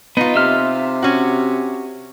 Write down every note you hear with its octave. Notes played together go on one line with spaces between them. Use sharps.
B3 D#4 F4
C3 E5 F6
C#4 F#4